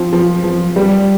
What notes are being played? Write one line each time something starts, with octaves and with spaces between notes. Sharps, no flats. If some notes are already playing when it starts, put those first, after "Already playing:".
Already playing: F3 C4
F3
F3
G3